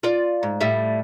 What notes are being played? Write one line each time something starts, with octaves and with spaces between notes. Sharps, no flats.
F4 D5
G#2
A2 G3 E5